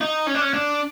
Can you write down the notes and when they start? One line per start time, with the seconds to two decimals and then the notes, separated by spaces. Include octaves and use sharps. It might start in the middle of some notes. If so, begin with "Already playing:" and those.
0.01 D#4
0.27 C#4
0.35 D4
0.41 C#4
0.54 D4